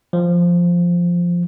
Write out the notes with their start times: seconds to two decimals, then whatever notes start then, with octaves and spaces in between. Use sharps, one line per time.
0.13 F3